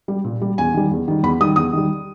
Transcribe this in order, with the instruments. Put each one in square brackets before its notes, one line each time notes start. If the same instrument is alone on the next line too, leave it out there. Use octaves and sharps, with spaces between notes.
[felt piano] G3
A#2
G3
E2 G#5
D#3 G3
E2
D#3 G3
E2 B5
D#3 G3 D#6
E2 D#6
D#3 G3